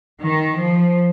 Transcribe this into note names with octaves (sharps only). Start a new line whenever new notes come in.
D#3
F3